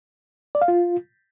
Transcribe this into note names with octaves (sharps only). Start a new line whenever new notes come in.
D5
F5
F4